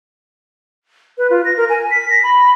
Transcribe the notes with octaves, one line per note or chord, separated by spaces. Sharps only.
B4
F4
A#6
A#4
G#5
B6
A#6
B5